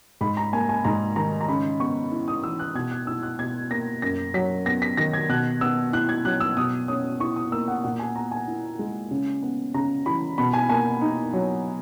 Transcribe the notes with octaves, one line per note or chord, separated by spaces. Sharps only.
G#2 B5
A#5
A#3 G#5
G#5
G#2 A#5
D#3 A#5
A#5
C#3 B5
B3 C#6
E4
D#6
E3 E6
F#6
B2 G#6
F#6
E4 E6
F#6
B2 G#6
A#3 A#6
F#2 A#6
F#3 B6
B3 A#6
B6
D#3 A#6
G#6
B2 F#6
B3 E6
E4 F#6
G#6
F#3 F#6
E6
B2 D#6
C#4 D#6
E4 C#6
D#6
A#3 E6
F#5
A#2 F#5
G#5
B3 A#5
G#5
E4
G#3
C#3
B3
C#3 A#5
E3 B5
B2 B5
G#5
A#3 G#5
D#4
F#3